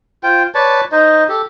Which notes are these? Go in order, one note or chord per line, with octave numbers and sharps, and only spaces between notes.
F4 C5 G5
B4 C#5 D5 A5
D#4 C5 D#5
G4 A4